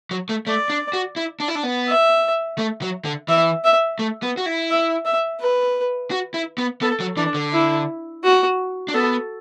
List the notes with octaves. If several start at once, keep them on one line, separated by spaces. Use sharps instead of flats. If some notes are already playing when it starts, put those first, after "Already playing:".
F#3
A3
A3 D5
D4
F#4
E4
D4
E4
D4
B3
E5
A3
F#3
D3
E3 E5
E5
A3
B3
F#4
E4
E5
E5
B4
F#4
E4
B3
B3 A4
F#3
E3 D4
D3
E4
F#4
D4
B3 A4